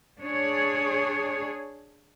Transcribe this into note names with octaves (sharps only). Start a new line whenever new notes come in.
D4 G#4 C#5